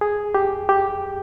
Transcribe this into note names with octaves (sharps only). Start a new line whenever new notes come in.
G#4
G4
G4